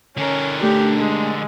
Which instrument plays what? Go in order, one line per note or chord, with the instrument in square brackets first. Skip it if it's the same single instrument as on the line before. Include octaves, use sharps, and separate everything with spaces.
[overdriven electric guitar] D3 A#4 [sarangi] C#4
[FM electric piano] A3 D4 [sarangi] G4
[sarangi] G#3